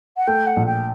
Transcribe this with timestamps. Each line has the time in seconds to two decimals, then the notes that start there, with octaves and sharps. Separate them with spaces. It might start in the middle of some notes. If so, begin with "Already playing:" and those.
0.17 F#5
0.27 A3 G5
0.46 F#5
0.56 A#1
0.66 G5